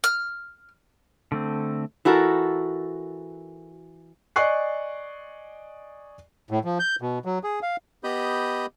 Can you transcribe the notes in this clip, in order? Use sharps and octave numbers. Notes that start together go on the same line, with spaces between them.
F6
D3 A3 C4
E3 F#4 A4 A#4
D5 D#5 G#5 C#6 F#6 C7
A2
F3
G6
B2
F#3
G#4
F5
B3 G4 D#5 B5 D#6 G6